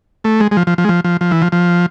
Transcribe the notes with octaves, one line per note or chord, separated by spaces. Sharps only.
A3
G#3
G#3
F3
F3
F3
G#3
F3
F3
F3
E3
F3
F3